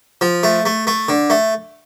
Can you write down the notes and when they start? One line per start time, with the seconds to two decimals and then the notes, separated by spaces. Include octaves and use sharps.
0.21 F3
0.43 A3
0.65 A3
0.87 A3
1.08 D3
1.30 A3